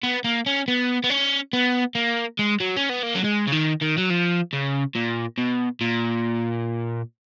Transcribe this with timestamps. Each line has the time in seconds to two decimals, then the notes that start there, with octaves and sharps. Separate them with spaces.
0.04 B3
0.24 A#3
0.46 C#4
0.68 B3
1.04 B3
1.10 C#4
1.53 B3
1.95 A#3
2.39 G#3
2.60 F#3
2.76 C#4
2.89 B3
3.03 A#3
3.15 F#3
3.24 G#3
3.48 C#3
3.53 D#3
3.82 D#3
3.98 F#3
4.10 F3
4.53 C#3
4.95 A#2
5.38 B2
5.81 A#2